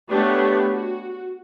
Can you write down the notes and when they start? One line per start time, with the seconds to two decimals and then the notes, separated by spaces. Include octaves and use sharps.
0.11 A3 B3 D4 G4 B4 C#5
0.70 F#4